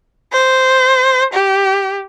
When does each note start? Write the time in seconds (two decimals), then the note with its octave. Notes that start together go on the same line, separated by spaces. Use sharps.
0.32 C5
1.33 G4